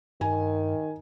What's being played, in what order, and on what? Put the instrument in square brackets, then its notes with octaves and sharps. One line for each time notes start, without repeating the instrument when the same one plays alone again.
[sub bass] G2 [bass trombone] D#3 [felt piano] G#5